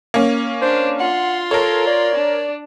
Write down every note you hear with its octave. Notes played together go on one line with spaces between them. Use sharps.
A#3 C#4
D4 C5
F4 F#5 C6
A4 A#4 C#5
D5
D4